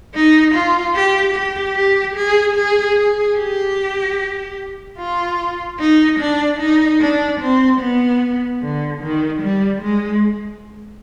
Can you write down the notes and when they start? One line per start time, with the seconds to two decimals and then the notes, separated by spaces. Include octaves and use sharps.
0.15 D#4
0.54 F4
0.95 G4
1.35 G4
1.76 G4
2.16 G#4
2.56 G#4
2.97 G#4
3.38 G4
4.99 F4
5.80 D#4
6.19 D4
6.59 D#4
7.00 D4
7.40 C4
7.80 B3
8.62 D3
9.02 D#3
9.42 G3
9.82 G#3